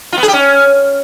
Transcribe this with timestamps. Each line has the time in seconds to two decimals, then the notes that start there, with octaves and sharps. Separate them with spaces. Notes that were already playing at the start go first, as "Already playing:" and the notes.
0.13 F4
0.18 B3
0.23 G#4
0.28 G4
0.33 C#4